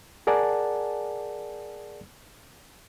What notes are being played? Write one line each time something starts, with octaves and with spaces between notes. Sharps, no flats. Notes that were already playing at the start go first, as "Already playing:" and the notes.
G#4 A#4 D5 F#5 G#5 A5